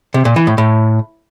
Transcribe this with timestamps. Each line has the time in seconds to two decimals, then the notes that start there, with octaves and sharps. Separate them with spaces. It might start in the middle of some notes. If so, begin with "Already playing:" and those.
0.14 C3
0.25 A#2
0.36 E3
0.47 A2
0.58 A2